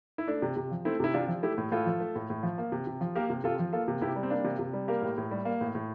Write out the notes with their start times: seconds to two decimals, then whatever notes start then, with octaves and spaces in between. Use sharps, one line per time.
0.18 E4
0.28 A3 D4
0.42 C3
0.57 C3
0.71 F3
0.85 A3 C4 E4
1.00 C3 E4
1.14 C3 D4 F4
1.28 F3
1.42 A3 E4 G4
1.58 A2
1.72 A2 F4 A4
1.86 F3
2.00 A3
2.16 A2
2.30 A2
2.43 F3
2.58 A#3
2.72 C3
2.87 C3
3.01 F3
3.15 A#3 G4 A#4
3.30 C3
3.44 C3 F4 A4
3.59 F3
3.73 A#3 F4 A4
3.88 C3
4.01 C3 E4 G4
4.16 G3
4.23 C4
4.30 A#3 D4
4.45 C3
4.59 C3
4.73 G3
4.88 A#3 G4 A#4
5.02 A2
5.18 A2
5.31 G3
5.45 A#3
5.61 A2
5.75 A2